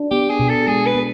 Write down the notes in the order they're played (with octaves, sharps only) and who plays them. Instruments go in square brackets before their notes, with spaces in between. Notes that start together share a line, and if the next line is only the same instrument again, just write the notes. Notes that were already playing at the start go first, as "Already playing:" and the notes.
Already playing: [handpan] D4
[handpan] B3 [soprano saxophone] G4
[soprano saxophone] G#4
[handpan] B2
[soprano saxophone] A4
[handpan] G#3 [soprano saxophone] G#4
[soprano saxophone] B4
[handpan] B3